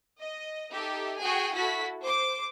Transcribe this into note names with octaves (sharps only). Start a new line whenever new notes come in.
D#5
D#4 G4 A4 E5
F#4 G#4 G5 G#5
E4 F#4 A4 B6
C5 D6